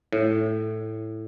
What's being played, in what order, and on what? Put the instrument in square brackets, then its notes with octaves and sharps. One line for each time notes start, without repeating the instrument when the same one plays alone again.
[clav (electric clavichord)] A2